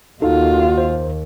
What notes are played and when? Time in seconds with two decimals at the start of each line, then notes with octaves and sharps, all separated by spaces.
0.22 D#2 D#4 F4 F#4 A4
0.78 C5